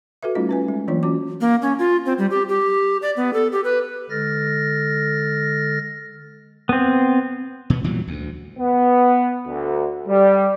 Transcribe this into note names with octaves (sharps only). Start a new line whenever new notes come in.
F#4 A4 B4 E5
G3 A3 C#4 D#4 F4 D#5
C#4 B4 G#5
G#3
E3 F#3 A#3 D4 F4 C#5
C#4 F#4 D6
A#3
C#4
F4
C4
G3
G4
G4
D5
B3
A4
G4
B4
D3 G#3 A4 F6 A6 A#6
B3 C4
B2 B3
A#2 E3 F#3 G3
D2
B3
D2
G3